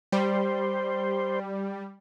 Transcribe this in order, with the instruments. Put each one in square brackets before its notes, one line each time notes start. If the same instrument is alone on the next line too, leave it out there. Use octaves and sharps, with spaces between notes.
[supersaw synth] G3 [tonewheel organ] C5